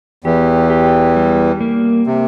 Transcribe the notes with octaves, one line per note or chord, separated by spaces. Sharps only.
E2 E3 G4
G4
G3
A#3
C3